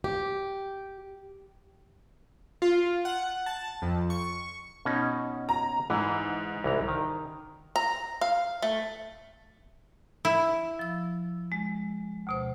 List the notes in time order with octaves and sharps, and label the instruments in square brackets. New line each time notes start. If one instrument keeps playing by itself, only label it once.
[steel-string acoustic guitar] G4
[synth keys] F4
F#5
A5
F2
C#6
[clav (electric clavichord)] B2 C#4 D#4
[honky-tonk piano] A#5
[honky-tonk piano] G#2 [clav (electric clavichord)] E3
[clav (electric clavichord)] C2 E3 A#5
D#3
[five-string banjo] A#5
F5
A3
[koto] E4
[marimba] F3 E6
G#3
D2 B2 C5